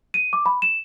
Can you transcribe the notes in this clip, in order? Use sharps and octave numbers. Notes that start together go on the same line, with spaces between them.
D#7
D6
B5
E7